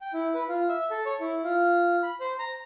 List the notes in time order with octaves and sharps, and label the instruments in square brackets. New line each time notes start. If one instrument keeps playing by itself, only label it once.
[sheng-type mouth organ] G5
E4
B4
F4
E5
A4
C#5
E4
F4
B5
C5
A#5